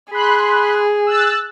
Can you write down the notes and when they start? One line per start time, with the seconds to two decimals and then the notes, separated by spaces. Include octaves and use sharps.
0.11 G#4 B5 C6 F#6
1.07 E6 F#6 A6